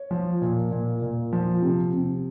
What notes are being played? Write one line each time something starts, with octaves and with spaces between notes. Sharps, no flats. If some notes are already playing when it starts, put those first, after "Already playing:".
Already playing: C#5
F3
A#2
A#2
A#2
F3
C3
C3